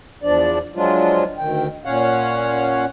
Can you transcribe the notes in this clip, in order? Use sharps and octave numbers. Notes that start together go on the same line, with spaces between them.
E2 F3 D4 D5
F3 F#3 G#3 D4 F4
D2 D#3 G5
A#2 C#4 C#5 F5 F#5